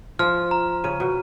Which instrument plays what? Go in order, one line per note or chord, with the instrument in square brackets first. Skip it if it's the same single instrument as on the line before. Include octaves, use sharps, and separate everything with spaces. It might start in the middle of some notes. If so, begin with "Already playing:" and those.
[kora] F3 [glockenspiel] F6
[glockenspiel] A#5
[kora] C#3 [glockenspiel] D#7
[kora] B2